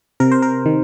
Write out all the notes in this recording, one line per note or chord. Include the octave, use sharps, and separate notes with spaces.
C3 A#4
C5
A#4
D#3